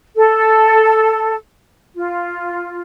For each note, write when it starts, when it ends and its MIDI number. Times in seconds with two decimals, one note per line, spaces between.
0.15 1.34 69
1.95 2.82 65